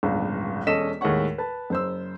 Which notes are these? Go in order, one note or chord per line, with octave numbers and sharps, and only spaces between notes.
D1 G1 C#2
E1 C#4 A4 D#5 B6 E7
D#2 A2 G#3 C#5 F#5 C#6
B4 A5
F#1 C5 E6